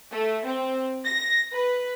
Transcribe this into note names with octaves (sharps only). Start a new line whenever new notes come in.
A3
C4
A#6
B4